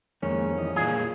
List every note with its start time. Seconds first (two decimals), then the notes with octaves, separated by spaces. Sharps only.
0.23 F2 D#3 G#3 A#3 C#4
0.58 E3 G3 D#5
0.76 A#2 G#3 F4 G#4